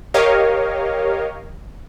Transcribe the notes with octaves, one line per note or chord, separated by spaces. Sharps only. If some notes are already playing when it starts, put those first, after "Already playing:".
G4 A#4 C#5 D#5 F5